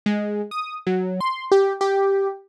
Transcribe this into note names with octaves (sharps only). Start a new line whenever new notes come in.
G#3
D#6
F#3
C6
G4
G4